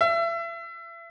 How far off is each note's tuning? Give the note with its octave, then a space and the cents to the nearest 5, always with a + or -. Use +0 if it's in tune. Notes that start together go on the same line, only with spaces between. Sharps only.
E5 +35